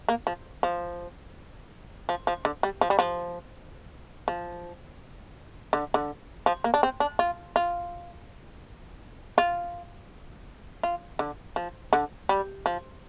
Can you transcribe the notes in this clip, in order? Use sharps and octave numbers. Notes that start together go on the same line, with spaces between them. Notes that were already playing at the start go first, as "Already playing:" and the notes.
A#3
F3
F3
F3
F3
D3
G3
F3
G3
F3
F3
D3
D3
F3
A#3
D4
C4
D4
F4
F4
F4
F4
D3
F3
D3
G3
F3